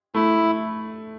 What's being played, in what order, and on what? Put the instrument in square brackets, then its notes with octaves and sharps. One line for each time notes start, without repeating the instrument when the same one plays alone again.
[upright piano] A3 [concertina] E4